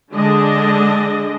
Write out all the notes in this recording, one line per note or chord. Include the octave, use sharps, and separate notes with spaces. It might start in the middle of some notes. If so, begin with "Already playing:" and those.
D3 G#3 D4 D#5